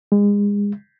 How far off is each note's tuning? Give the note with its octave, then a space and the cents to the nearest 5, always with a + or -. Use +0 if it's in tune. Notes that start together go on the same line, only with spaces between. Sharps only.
G#3 -30